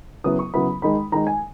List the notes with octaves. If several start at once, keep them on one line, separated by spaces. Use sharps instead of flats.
C#3 F#3 B3 E4 D#6
C#6
C#3 F#3 B3 E4 B5
D#3 G#3 D#4 B5
D#3 G#3 D#4 A#5
G#5